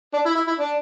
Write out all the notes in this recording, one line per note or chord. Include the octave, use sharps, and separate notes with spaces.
D4
E4
E4
E4
D4